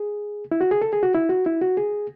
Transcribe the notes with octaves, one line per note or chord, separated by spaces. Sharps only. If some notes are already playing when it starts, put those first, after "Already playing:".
Already playing: G#4
E4
F#4
G#4
A4
G#4
F#4
E4
F#4
E4
F#4
G#4